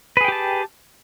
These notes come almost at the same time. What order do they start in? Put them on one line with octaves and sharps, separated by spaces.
B4 G#4 G5 G4 A5